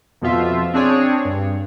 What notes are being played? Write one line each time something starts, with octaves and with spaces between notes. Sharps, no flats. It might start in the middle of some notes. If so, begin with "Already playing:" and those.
F2 B2 F3 F4 E5
C4 D4 G#4 C#5
G2